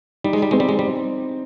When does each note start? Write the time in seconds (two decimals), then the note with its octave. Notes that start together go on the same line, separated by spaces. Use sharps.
0.24 G3 D#4
0.33 G#3
0.42 G3
0.51 G#3 C4
0.60 G3
0.69 G#3
0.79 G3